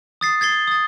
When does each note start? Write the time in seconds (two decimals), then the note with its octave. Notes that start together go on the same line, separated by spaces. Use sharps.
0.21 D#6 A6 C7
0.41 G#6 A6 C7 G7
0.67 D#6 A6